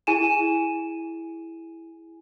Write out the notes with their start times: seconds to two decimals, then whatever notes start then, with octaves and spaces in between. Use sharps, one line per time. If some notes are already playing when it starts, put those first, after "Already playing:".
0.07 E4 G#4 G#5 D#7 E7